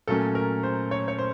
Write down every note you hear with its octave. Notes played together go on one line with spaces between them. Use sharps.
A#2 F#3 A3 C#4 A4
A#4
C5
C#5
C#5
C5